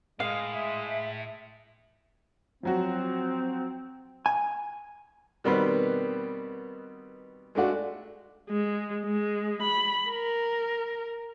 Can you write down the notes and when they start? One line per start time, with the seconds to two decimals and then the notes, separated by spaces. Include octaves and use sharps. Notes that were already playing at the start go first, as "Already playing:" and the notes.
0.20 A2 G#3 F5
0.51 E5
2.63 F3 F#3 C4 F#4
4.26 G#5
5.44 B2 D#3 G3 B3 C4 B4
7.55 G#3 A3 D4 F#4
8.51 G#3
9.06 G#3
9.62 B5
10.10 A#4